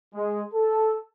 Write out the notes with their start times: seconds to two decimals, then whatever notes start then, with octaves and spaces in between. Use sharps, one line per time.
0.15 G#3
0.54 A4